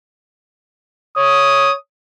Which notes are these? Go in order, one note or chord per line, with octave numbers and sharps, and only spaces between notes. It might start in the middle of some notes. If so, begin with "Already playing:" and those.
C#5 D#6